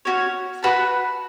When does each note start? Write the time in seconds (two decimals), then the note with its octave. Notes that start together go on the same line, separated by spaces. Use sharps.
0.05 C#4 F#4 C#5
0.63 F#4 B4 F#5 A5